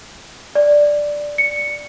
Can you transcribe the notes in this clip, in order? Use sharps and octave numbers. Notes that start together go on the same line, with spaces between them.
D5
C#7